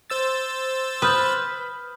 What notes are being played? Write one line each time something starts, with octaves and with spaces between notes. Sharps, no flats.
C5 E6 A6
B4 D#6 F6 G6